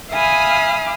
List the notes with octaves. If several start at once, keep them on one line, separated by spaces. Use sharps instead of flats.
E5 F5 G#5 B5 D#6 F6